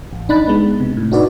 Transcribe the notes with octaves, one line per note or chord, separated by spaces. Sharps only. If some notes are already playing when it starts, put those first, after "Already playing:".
A1
A#1 D4 D#4 B5 F#6 A6
G#3 B3
C3
A2
D4 D#4 F#4 B4 D5